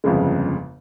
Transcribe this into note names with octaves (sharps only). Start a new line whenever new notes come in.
G1 F2 C#3 G#3